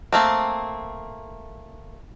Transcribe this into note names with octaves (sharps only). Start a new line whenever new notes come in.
A3 A#3 C4